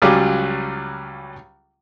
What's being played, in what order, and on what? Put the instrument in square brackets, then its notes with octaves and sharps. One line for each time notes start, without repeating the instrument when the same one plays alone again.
[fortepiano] C#2 F#3 G3 F4 G#4 D6